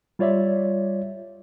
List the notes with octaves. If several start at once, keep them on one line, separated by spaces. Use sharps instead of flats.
G3 F4 C#5 D5 E5